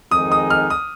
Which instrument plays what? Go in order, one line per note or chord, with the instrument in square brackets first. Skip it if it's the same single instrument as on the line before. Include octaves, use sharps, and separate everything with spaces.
[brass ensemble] F2 D#3 G#3 D#4 G#4 [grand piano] D#6
[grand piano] D#6
F6
D#6